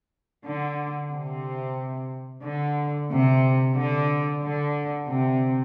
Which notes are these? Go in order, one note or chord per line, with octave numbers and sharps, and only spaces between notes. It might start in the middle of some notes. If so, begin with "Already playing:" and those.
D3
C3
D3
C3
D3
D3
C3